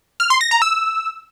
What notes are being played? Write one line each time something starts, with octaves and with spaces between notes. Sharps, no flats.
F6
C6
A#6
A#5
E6